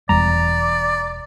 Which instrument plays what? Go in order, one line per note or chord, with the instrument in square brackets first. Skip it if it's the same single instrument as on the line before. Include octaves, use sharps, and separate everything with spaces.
[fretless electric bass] E1 E2 G3 [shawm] D5 [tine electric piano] A#5